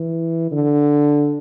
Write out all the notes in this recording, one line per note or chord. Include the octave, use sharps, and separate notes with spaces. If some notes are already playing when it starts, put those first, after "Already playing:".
Already playing: E3
D3